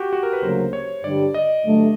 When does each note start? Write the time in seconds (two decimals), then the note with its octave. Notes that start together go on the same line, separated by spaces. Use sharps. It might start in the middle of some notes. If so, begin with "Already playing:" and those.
Already playing: F#4 G4
0.13 F#4
0.23 A#4
0.33 B4
0.43 D2 C#3 F#3 A#3 C5
0.73 C#5
1.04 G2 D3 G3 D5
1.34 D#5
1.65 G2 D3 F#3 A3